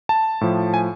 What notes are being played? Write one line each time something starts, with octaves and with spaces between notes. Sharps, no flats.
A5
A2 F3
G#5